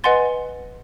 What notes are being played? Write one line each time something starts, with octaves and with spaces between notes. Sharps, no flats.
B4 D#5 F#5 G#5 C6 A6